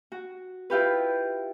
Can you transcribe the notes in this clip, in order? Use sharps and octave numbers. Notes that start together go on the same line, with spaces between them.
F#4
E4 F4 G4 B4